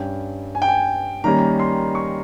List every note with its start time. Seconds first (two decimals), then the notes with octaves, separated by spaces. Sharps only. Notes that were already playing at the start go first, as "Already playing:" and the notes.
Already playing: G2 G3 C#4 G5
0.55 G#5
0.62 G5
0.68 G#5
1.24 D#3 G3 A#3 C#4 A#5
1.59 C6
1.95 C#6